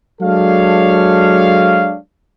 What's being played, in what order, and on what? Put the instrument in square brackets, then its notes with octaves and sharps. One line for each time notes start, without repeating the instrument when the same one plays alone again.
[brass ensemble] F#3 G#3 D4 A4 C#5 F5